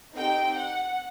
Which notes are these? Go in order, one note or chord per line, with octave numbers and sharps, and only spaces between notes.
C4 D#4 G4 G5
F#5